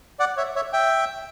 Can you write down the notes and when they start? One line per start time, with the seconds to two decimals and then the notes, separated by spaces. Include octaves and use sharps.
0.19 D5 F#5
0.37 C#5 E5
0.56 C#5 E5
0.73 E5 G5